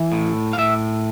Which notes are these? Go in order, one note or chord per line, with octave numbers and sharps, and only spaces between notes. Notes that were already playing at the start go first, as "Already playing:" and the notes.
Already playing: E3
A2
F5
A2 E5